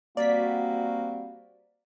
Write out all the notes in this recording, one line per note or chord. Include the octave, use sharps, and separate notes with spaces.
G3 A#3 C4 F#4 D5 B6